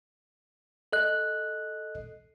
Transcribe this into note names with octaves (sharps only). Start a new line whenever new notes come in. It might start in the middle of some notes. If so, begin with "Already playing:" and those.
A4 D#5 F#6